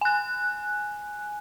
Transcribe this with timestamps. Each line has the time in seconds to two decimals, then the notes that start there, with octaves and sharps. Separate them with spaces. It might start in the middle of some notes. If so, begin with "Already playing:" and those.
0.01 G#5 F#6